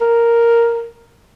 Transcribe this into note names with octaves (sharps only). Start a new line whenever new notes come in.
A#4